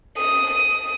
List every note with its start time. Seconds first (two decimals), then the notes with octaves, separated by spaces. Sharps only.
0.17 D#6
0.50 D#6